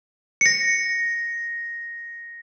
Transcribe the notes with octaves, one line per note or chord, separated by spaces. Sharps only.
A#6 C#7